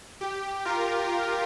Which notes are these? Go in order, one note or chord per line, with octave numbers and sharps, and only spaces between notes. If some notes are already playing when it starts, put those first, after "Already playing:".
G4
F4 A#4